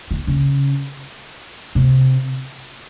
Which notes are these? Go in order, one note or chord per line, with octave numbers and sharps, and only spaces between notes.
D3
C#3
C3